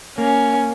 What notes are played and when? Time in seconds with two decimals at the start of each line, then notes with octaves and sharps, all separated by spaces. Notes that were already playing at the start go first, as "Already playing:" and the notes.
0.18 A#3 C#4